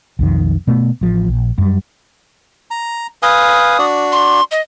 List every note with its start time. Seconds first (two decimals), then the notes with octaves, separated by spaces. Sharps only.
0.19 B1 F2 D#3
0.67 B2 A3 B3
1.01 A1 F3
1.28 A#1
1.58 F#2 G3
2.71 A#5
3.23 B4 F5 G#5 D#6
3.79 D4 F#4 D5
4.12 C6
4.51 D#5